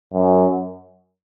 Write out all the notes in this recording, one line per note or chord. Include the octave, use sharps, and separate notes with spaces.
F#2